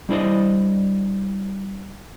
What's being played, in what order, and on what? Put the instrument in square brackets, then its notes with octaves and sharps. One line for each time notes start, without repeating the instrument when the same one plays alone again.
[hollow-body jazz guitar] G3 D4 E4 C5 D5 D#5